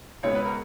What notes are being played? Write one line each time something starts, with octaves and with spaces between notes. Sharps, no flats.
C#2 B2 G#3 B3 C#5
B4
A#4